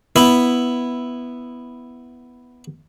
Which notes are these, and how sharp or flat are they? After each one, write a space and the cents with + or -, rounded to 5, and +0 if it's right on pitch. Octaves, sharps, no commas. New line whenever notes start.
B3 +0 E4 +0